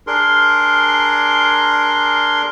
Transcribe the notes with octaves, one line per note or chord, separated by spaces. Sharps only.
D4 G#4 A#4 C6